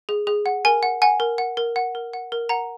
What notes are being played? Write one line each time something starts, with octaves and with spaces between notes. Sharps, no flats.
G#4
G#4
F#5
A#4 G#5
F#5
F#5 G#5
A#4
F#5
A#4
F#5
A#4
F#5
A#4
F#5 A#5